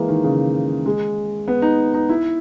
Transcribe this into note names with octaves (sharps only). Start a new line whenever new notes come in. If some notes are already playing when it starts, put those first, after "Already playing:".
Already playing: E3 G#3 A#3
D#3
C#3
G#3
B3
D#4
D#4
E4